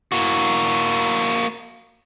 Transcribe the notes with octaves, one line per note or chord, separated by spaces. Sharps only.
A#3 F#4